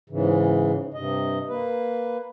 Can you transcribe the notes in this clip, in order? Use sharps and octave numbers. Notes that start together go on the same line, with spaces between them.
G#2 C#3 E3
G2 C3 D#5
A#3 B4